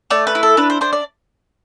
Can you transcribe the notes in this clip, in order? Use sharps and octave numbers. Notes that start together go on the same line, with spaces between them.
A3 D5
B4
E4
A4
D4 B4
C5
D4 C5
D5